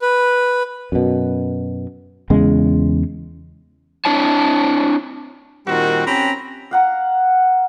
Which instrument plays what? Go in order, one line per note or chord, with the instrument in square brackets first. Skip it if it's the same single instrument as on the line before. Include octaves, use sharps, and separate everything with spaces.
[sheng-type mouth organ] B4
[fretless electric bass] F#2 B2
E2 C#3 G#3
[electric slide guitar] C4 D4 E4 C#5 A5
[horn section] A#2 D#3 G3 C4 F#4
C4 C#4 G4 A#5 B5
[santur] F5 F#5 A#5